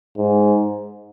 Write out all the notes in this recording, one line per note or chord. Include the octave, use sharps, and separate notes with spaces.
G#2